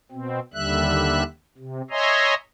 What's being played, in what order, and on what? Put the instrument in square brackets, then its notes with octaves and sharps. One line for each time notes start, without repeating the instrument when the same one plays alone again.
[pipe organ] B2 C4
D#2 D3 G3 E5 F#6
C3
C#5 D#5 E5 G#5 A#5 C6